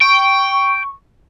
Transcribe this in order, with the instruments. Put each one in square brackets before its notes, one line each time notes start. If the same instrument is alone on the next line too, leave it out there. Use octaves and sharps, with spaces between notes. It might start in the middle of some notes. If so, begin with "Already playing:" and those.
[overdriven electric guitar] G5 [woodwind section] C#6